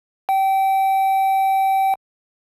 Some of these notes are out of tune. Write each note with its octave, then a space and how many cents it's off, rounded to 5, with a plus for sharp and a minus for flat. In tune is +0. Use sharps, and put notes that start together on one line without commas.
G5 -25